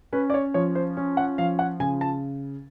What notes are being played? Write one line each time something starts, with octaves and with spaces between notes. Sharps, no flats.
C#4 B4
D5
C#5
F3 C#5
C5
C#4
F#5
F3 F5
F#5
C#3 G#5
A5